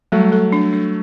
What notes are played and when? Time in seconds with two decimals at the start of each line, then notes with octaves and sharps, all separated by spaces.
0.12 F#3 G3 A3
0.32 A4
0.52 D4
0.73 D4